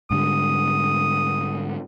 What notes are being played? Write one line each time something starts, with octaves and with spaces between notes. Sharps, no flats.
G#2 D3 G3 D#6